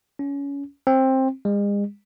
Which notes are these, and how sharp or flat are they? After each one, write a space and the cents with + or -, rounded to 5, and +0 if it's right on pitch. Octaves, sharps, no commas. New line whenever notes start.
C#4 +25
C4 +15
G#3 -40